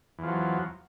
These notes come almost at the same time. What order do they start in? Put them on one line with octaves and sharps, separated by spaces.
E2 F3 F#3